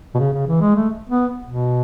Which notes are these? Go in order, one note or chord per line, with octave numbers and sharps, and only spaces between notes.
B2
C#3
C#3
E3
G#3
A3
B3
B2